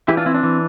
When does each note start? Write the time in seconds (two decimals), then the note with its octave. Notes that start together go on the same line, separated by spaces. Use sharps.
0.08 E3 E4 G4
0.17 D4 F4
0.26 C4 E4
0.34 D4
0.43 E3